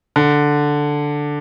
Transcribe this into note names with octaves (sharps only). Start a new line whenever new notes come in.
D3